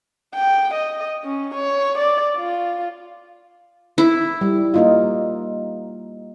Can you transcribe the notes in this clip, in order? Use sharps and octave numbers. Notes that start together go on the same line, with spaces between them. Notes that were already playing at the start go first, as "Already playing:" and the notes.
G5
D#5
C#4
C#5
D5
F4
E4
G3
A#3 D#4 F4